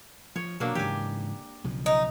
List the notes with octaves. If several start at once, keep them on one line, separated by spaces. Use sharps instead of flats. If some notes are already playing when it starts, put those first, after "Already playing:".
F3 C#5
B2 F#3 A#3 D4
G#2 C#3 E3 G4 G#5
B1 C#3 F3
D#4